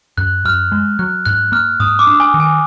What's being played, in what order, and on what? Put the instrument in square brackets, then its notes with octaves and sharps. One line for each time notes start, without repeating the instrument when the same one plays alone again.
[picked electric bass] F#2 [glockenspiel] F#6
[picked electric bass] F#2 [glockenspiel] F6
[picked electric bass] G#3
[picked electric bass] F#3 [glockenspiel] F#6
[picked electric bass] G#2 [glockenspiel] F#6
[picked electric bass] A#3 [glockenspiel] F6
[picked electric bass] G#2 [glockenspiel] D#6
[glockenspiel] D6
[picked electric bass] D4
[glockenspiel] G#5
[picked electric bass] D#3
[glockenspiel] G#5